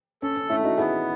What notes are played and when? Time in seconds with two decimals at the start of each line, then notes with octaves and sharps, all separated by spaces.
0.22 C#4 A4
0.36 C#4
0.49 A3 C#4 E4
0.64 D#4 F#4
0.77 B3 E4 G#4